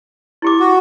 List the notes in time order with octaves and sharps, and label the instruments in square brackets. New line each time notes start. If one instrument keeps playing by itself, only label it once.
[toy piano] E4 G4 D6
[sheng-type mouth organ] F#4